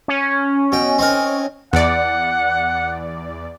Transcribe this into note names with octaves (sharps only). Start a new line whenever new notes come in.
C#4
B2 G5
C4 D#4 A#4
E2 D5 F#5